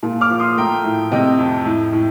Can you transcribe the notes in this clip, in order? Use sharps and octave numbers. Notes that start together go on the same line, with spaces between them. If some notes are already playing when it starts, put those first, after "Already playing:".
A#2
D6 F6
F3
C6 D#6
A3 G5 A#5
A2
C3 D#5 G5
F2
A2
A2